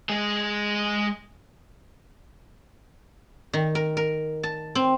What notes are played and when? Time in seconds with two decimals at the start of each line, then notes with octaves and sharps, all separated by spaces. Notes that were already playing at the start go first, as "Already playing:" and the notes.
0.09 G#3 G#4
3.53 D#3
3.75 A#4
3.97 A#4
4.43 A5
4.75 C4